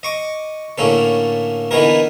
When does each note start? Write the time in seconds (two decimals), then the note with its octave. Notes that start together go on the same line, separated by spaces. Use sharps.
0.03 D#5 C#6 D6
0.78 A2 D3 A#3 C#4 A4
1.71 D3 E3 B3 D#4 G#4 A#4